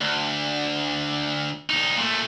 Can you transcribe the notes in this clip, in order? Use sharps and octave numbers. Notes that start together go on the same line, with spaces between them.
D2
C2 D#4
A#2 A3